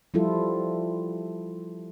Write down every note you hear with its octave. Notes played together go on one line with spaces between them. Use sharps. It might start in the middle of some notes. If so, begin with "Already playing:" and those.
F3 G3 E4 F4 A4